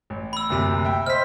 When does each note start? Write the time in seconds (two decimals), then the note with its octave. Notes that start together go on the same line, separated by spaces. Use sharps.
0.10 A1
0.33 B5 E6
0.50 F#1 D2 C3
0.84 E5 G5
1.06 C5 D#5 F6 B6